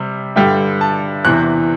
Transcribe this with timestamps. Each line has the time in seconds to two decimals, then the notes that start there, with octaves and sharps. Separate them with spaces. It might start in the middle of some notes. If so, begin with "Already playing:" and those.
Already playing: C3 G3
0.36 G2 D3 G3 G5
0.81 A5
1.25 E2 C3 E3 F#6